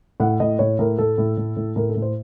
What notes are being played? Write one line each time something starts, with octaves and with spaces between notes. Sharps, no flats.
A2 F#5
A2 D#5
A2 C#5
A2 A#4
A2 A4
A2
A2
A2
A2 A#4
A4
A2
C5